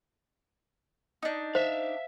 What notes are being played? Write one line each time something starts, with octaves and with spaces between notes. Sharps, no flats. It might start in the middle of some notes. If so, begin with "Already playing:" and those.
D4 D#4
C5 E5 F5